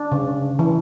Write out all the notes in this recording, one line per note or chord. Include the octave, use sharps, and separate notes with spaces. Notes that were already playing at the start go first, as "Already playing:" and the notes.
Already playing: D4
C#3
E3